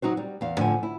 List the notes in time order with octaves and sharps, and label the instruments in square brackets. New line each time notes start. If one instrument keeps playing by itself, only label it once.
[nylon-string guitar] F#3 D#4 F#4 C5
G3
E2 F5
A2 D3 F3 F#5 G#5
E4